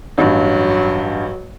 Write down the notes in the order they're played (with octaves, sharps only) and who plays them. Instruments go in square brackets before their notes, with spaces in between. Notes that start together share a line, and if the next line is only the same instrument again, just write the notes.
[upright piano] A1 G2 [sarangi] F#3